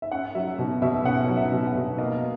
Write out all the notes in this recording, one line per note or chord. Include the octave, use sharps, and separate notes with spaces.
E5
C#4 F#5
F#3 E5
B2
B2 E5
C#4 F#5
F#3
E5
B2
F#5
B2
A#3 D#5